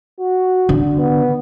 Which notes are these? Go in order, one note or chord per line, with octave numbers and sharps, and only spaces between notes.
F#4
D3
B3